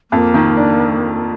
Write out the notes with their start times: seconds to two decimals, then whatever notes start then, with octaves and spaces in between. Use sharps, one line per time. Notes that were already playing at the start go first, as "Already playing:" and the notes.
0.11 F2 A#3
0.34 D#3
0.57 D4